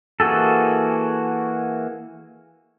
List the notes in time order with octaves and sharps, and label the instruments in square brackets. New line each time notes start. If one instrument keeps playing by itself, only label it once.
[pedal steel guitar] E3 A#3 F#4 G#4 A4